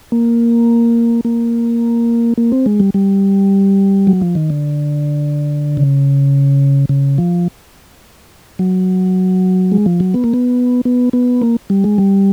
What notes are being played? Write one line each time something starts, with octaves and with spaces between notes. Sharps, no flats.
A#3
A#3
A#3
C4
G#3
G3
G3
F#3
F3
D#3
D3
C#3
C#3
F3
F#3
G#3
F3
F#3
B3
A#3
B3
B3
B3
A#3
G3
G#3
G3